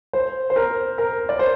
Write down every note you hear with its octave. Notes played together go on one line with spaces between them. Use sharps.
C5
C5
A#4
A#4
D5
C5